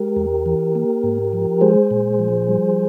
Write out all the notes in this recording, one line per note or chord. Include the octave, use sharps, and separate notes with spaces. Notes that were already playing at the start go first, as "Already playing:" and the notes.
Already playing: G#3 G4 A#4
E2
E3
A#3
G#2
F3
G#3 G#4 C5
A#2
F3
G3